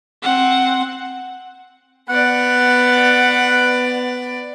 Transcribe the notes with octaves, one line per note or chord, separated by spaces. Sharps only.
C4 F#5
B3 D5 F#5